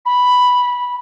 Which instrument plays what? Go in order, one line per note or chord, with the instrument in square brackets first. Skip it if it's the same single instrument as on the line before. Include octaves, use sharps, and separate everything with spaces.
[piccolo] B5